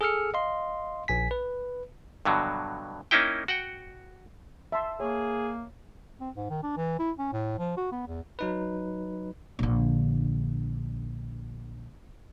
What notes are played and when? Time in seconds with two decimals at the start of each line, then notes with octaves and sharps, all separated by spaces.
0.01 G#4 A4 E6 F6 C#7
0.34 D#5 F5 C6
1.08 A#1 G#5 B6
1.31 B4
2.25 G2 B2 D3 F#3
3.11 A#3 C#4 D#4 E4 G5
3.48 F#4 F#5 G5
4.72 E5 A5 C6
5.00 A#3 G#4 C#5
6.21 C4
6.36 G#2
6.50 D#3
6.63 D4
6.77 E3
6.99 E4
7.19 C#4
7.33 A2
7.59 F3
7.77 F#4
7.92 B3
8.07 E2
8.39 F#3 D#4 B4
9.59 A#1 D3